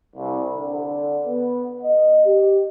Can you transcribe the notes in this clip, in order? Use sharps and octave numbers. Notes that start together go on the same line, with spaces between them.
C2
D3
B3
D#5
G4